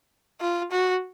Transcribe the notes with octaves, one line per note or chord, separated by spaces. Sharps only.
F4
F#4